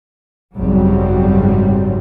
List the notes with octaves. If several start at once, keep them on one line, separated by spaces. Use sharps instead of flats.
G#1 F#2 C#3 F#3 G3 C4